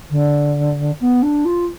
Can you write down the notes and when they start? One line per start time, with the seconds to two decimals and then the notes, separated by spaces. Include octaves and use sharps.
0.10 D3
1.01 B3
1.22 D4
1.45 F4